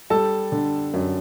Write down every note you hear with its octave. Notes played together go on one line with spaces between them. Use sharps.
G3 A4 A5
D3
F#2